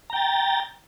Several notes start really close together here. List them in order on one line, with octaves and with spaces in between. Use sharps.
A#5 G5 A6